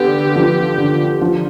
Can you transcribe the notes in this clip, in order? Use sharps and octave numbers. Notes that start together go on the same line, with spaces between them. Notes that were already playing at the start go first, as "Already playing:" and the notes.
Already playing: D3 B3 G4
F3
D3
F3